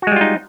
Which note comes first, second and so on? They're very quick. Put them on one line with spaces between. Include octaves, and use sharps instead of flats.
F#4 G#3 G3 F4 D#4